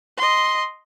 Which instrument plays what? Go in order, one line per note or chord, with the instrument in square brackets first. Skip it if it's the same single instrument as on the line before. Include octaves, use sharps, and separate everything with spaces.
[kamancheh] D#5 C6